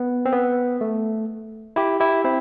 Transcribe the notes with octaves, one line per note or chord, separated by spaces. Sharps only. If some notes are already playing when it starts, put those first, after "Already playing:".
Already playing: B3
C4
B3
A3
E4 G4
E4 G4
C4 E4